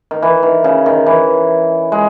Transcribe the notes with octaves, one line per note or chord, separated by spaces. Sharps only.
D#3
E3
D#3
C#3
D#3
E3
G#3